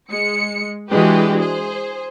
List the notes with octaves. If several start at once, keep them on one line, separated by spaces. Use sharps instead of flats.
G#3 C#7
E3 G#3 D4 F#4 G4 B4
G#4 C5